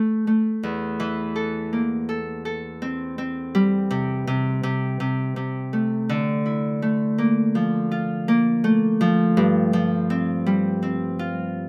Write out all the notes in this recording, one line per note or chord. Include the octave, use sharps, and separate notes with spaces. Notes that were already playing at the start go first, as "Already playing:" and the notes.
Already playing: A3
A3
E2
E3
A4
A#3
A4
A4
C4
C4
G3
C3
C3
C3
C3
C3
A3
D3
E4
A3
A#3
F3
F4
A#3
A3
F3
G2
F3
C4
G3
C4
F4